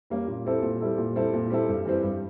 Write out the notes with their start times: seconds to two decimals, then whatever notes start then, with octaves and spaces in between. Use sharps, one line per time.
0.10 G3 A#3 C#4
0.27 A#2
0.45 G3 C4 E4 A4
0.62 A#2
0.80 G3 C4 E4 A4
0.98 A#2
1.16 G3 C4 E4 A4
1.34 A#2
1.50 G3 C4 E4 A4
1.69 G2
1.85 E3 G3 C4
2.03 G2